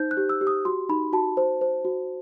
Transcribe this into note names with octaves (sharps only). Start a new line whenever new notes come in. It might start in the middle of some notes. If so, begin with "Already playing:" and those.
Already playing: D#4 C5 G6
F#6
G4
E6
G4
D#6
F#4 C6
D#4 B5
F#4 A5
C5
C5
F#4